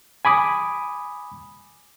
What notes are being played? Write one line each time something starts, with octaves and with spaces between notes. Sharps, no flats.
G#5 B5 D6 D#6